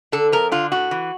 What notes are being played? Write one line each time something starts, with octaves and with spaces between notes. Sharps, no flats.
D3 A4
F2 A#4
D3 F4
A2 F#4
E3